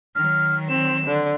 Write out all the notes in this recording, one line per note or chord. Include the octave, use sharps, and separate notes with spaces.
D#3 F#3 F6
C4 E7
D3